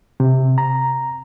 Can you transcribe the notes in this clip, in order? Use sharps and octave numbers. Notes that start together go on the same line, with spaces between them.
C3
A#5